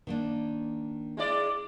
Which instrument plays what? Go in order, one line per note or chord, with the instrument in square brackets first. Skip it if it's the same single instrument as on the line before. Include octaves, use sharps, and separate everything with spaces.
[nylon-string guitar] D#3 A#3 D4
[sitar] G#3 E4 D5